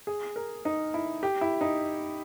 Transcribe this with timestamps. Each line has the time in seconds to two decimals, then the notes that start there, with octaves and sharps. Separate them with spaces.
0.07 G#4
0.36 A#4
0.65 D#4
0.94 E4
1.23 G4
1.41 E4
1.61 D#4